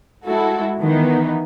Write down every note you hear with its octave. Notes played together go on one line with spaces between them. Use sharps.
G#3 E4 F#4 A4
D#3 E3 B3 D#4